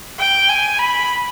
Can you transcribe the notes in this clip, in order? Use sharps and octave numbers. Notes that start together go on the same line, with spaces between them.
G5
G#5
B5